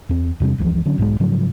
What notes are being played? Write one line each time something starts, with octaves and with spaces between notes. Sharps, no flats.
E2 C4
E2 C3 G3 D4
F#1 C#2 E3 F3
D3 F#3 C#4
B1 G#2 G3 G#3
G#2 C#3 F3 F#3